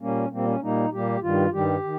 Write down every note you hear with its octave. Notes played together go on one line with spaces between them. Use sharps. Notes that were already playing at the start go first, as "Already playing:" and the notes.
A#2 G3 A#3 C#4
A#2 G3 A#3 C4
C#4
A#2 G3 A#3 D#4
A#2 G3 A#3 G4
G2 D#3 G3 F4
G2 D#3 G3 G4
D#3